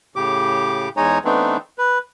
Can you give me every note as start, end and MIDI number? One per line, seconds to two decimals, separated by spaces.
0.16 0.89 45
0.16 0.89 49
0.16 0.89 67
0.16 0.89 86
0.97 1.18 40
0.97 1.18 56
0.97 1.18 63
0.97 1.18 73
0.97 1.18 80
0.97 1.18 82
1.25 1.57 52
1.25 1.57 57
1.25 1.57 59
1.25 1.57 60
1.25 1.57 62
1.25 1.57 63
1.78 1.98 71